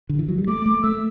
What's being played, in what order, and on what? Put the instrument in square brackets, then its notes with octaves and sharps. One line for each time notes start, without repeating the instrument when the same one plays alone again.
[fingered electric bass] D3
E3
F#3
G3
[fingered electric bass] A3 [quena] D6
[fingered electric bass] A3
[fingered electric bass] A3 [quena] E6